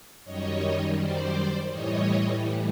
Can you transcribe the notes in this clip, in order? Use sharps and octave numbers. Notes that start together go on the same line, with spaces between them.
F#2 D#3 G3 C#5 D#5
C5 D5
A2 E3 G3 C#5 D#5